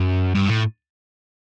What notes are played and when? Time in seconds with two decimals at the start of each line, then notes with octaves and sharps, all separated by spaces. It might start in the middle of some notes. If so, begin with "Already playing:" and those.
Already playing: F#2
0.35 G2
0.48 A2